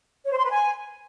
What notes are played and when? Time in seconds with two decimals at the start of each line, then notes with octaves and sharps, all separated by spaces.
0.25 C#5
0.31 C5
0.38 C6
0.44 B4
0.51 G#5